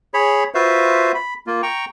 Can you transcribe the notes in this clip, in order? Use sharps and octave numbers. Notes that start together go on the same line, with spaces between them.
G#4 C#5 B5
F4 F#4 B4 C5 E5 F5
B5
A#3 F4
G5 A#5 C#6